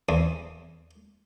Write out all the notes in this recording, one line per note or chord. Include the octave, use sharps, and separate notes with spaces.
E2